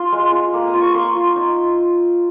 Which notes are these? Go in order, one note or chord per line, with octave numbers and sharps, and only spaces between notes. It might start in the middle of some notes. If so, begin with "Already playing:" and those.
Already playing: F4 C6
G#3
F4
A#3
D#6
F4
C#6
A#3 C6
F4
D#4